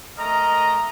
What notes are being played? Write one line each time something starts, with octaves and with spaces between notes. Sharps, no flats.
A3 A#4 D#5 A#5